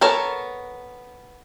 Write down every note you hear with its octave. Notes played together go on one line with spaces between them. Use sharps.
B3 A4 A#4 C#5 A5